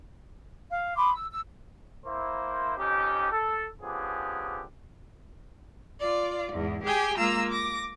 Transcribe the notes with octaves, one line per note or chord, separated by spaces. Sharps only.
F5
B5 C6 D6 D#6
E6
E6
A#3 E4 C5
F2 C#4 D#4 G4
A4
D3 F3 B3 C#4 G4 G#4
F4 D5
E2 G#2
G4 G#4 G5 G#5
G#3 A#3 F4 A#5 E6
D6 A#6